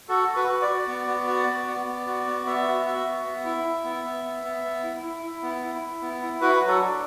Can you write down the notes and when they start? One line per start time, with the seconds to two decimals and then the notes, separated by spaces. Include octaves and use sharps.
0.09 F#4 A4
0.28 F#4
0.35 B4
0.48 F#4
0.61 D5
0.68 F#4
0.88 B3
1.07 B3
1.28 F#4
1.47 B3
1.67 B3
1.87 B3
2.06 F#4
2.26 B3
2.46 B3 E5
2.66 F#4
2.85 F#4 E5
3.05 B3
3.25 B3
3.45 E4
3.65 E4
3.84 B3
4.04 B3
4.24 B3
4.43 B3
4.63 B3
4.83 E4
5.03 E4
5.23 E4
5.43 B3
5.62 E4
5.82 E4
6.01 B3
6.21 E4
6.41 F#4 B4
6.61 F#3
6.68 A4
6.81 D4